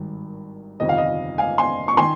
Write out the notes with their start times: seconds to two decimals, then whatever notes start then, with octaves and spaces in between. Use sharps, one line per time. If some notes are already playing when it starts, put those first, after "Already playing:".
Already playing: G#1 G2 D#3
0.80 G1 F2 C3 D#3 D#5
0.89 F5
0.98 D#5
1.38 F5 G#5
1.58 G#5 C6
1.88 C#6
1.97 D#3 G#5 C6